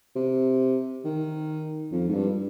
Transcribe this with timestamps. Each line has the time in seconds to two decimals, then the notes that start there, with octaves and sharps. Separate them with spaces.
0.16 C3
1.05 D#3
1.92 F2
2.09 G#2
2.14 G2